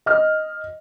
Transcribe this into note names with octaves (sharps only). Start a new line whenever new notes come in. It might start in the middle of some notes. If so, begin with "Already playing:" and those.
D#5 F6